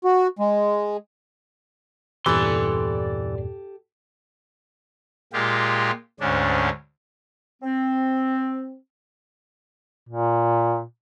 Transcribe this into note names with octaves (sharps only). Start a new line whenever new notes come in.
F#4
G#3
E2 G2 A#2 E3 G4 A4 D5 C6
A#2 G#3 F4 G4
D2 G#2 C#4 D4
C4
A#2